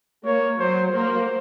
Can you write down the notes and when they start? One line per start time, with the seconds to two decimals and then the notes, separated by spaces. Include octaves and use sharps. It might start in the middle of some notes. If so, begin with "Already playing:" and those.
0.24 A#3 C#5
0.59 F#3 C5
0.94 A#3 C5